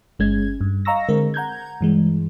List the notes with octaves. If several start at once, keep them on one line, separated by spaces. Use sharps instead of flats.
G1 G#3 C#4 G#6
G2
D#5 F5 A#5 C#6 E6 A#6
D3 G#3 C4 A#4
F#5 A#5 G6 G#6
G2 E3 G#3